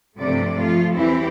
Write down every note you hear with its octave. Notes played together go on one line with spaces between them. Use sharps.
G2 C3 F3 A3 C4 D5
F3 A3 F4
E2 E3 G3 C4 E4 G4